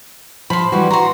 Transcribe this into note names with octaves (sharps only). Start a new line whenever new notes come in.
F3 B5 C6
E3 G3 F#4
F#4 A#5 C6